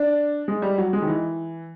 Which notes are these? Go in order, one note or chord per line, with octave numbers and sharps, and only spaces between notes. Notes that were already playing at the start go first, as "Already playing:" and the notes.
Already playing: D4
G#3
G3
F#3
G#3
D#3
E3